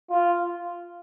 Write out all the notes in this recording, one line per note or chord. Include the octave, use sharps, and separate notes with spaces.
F4